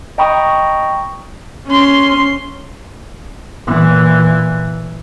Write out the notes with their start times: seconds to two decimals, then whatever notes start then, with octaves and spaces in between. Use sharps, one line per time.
0.18 D#5 G5 A#5 B5 C#6 D#6
1.67 C#4 C6
3.67 A#2 E3